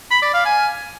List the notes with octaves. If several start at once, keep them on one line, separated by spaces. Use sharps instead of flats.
B5
D5
F5
G#5